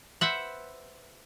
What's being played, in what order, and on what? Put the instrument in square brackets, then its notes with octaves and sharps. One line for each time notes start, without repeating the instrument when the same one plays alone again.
[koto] B4 C5 E5 F#5